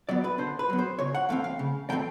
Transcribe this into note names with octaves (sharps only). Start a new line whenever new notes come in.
F#3 B3 D5
B4
D3 C5
B4
F#3 B3
C5
C#3 C#5
F#5
E3 A3 C4 F5
F5
C#3
E3 A3 C4 G5